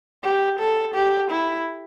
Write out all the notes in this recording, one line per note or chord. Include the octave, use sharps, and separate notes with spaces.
G4
A4
G4
E4